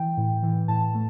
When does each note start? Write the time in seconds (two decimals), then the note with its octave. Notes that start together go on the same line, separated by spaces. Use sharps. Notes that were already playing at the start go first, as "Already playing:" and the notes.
Already playing: E3 G5
0.17 A2
0.43 E3
0.68 A2 A5
0.94 A3